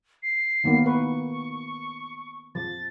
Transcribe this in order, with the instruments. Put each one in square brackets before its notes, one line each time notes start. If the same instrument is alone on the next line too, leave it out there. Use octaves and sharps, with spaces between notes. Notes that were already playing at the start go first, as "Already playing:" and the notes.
[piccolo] C7
[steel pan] D#3 A#3 B3
[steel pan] B4 [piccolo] C#6
[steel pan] F3 [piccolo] A6